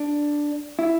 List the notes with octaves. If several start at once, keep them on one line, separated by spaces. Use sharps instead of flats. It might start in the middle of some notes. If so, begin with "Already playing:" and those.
Already playing: D4
E4